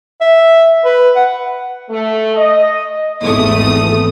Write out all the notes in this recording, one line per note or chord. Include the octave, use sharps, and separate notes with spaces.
E5
B4
F#5
A3
D#5
G#1 E2 A3 D#6